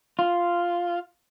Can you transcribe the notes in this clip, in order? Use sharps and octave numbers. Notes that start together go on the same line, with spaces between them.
F4